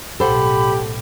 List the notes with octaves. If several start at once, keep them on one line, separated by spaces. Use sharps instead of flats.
B1 A2 G4 A4 C5 F#5 B5